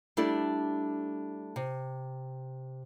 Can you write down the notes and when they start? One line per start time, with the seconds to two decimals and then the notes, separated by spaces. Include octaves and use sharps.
0.17 G3 A3 D4 E4 G4 A4
1.56 C3